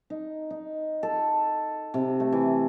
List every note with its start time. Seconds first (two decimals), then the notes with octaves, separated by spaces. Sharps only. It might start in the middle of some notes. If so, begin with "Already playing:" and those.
0.10 D#4
0.50 D#4
1.03 A4
1.94 C3
2.20 A3
2.33 E3